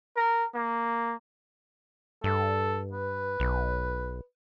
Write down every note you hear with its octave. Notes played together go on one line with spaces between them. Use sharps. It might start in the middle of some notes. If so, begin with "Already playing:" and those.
A#4
A#3
G2 A4
B4
B1